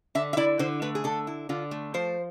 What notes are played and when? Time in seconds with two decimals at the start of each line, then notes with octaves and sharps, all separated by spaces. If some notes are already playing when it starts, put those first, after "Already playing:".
0.15 D3 E5
0.33 E5
0.37 E4 D5
0.59 D3 C5
0.82 A3 B4
0.95 G#4
1.04 D3 A4
1.27 E4
1.49 D3 F4
1.71 A3
1.94 F3 C5